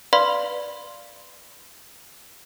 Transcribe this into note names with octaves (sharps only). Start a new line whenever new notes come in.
B4 D5 F5 B5 C6